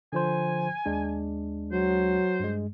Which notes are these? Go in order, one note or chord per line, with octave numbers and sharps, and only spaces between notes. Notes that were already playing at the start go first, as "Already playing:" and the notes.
D3 F3 C5 G#5
D#2 G#3 D4
F#3 C5
G2 G#3